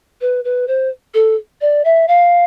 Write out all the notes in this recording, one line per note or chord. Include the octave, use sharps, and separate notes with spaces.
B4
B4
C5
A4
D5
E5
F5